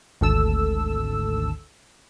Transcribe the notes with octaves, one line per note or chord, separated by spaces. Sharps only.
G#1 D2 A4 E6